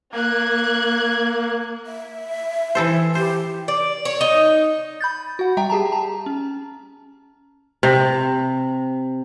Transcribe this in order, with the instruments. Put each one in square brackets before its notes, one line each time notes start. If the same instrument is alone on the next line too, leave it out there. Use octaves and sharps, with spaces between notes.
[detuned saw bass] A#3 [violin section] F#6 G#6
[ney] E5
[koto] E3 A4 C5
[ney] G4 [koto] C5
[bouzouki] D5
C#5
D#4
[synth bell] B5 G6 A6
F#4 F#5
G3 E5 G5 A#5
G4 G#4 A5 A#5
A5 A#5
C#4
[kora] C3